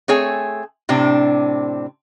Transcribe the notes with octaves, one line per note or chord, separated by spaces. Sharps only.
A3 C4 G#4 C#5 G#5
A2 C3 C4 D4